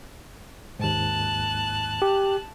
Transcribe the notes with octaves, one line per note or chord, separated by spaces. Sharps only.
D#2 G#2 A5 F#6
G4